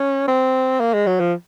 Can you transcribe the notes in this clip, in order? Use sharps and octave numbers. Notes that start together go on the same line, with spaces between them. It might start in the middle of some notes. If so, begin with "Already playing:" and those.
Already playing: C#4
C4
A#3
G#3
F#3
F3